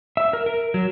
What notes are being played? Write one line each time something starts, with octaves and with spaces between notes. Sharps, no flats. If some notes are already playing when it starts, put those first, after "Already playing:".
E5
A#4
A#4
F#3